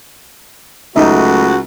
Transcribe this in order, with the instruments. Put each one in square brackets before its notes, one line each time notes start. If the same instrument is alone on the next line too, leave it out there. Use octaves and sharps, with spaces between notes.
[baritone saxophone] C#2 [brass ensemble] F#3 A3 [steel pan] D#4 E5 [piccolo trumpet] F#4